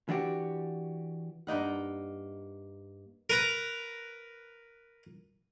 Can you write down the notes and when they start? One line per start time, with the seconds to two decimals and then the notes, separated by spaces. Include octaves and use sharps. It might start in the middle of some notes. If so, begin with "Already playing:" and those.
0.09 E3 D4 F#4 G4
1.47 G2 A#3 D#4 F#5
3.30 A#4 B4 A#5